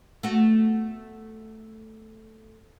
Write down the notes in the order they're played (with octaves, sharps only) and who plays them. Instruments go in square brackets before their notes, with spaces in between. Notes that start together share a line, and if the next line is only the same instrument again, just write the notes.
[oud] A3 B3 F#4